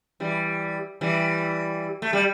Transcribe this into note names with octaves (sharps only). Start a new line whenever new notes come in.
E3 G3
E3 G3
A3
G3